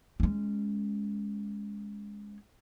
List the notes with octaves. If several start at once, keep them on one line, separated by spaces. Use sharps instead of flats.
G#3 C#4